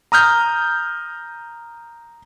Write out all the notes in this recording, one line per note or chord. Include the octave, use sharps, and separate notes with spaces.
A#5 D#6 F6 G6